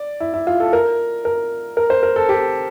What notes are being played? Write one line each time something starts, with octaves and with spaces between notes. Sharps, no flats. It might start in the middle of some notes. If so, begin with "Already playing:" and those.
Already playing: D5
E4
E4
F4
A4
A#4
A#4
A#4
C5
A#4
A4
G4